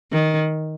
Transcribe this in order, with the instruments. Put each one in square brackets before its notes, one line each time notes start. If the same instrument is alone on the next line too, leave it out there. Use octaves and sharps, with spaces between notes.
[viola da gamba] D#3